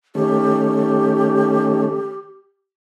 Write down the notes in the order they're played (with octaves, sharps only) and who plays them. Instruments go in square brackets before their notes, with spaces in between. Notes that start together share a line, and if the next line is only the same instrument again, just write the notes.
[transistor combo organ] D#3 A3 C#4 [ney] G4